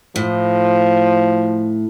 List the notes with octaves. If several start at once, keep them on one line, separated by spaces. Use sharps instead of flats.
A2 F3